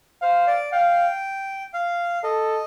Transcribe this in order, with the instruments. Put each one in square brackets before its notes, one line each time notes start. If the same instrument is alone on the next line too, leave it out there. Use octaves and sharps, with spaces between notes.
[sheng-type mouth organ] C5 [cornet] F5
[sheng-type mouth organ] D5
[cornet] F5 [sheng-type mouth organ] G5
[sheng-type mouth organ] F5
[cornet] A4 [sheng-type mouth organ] D#5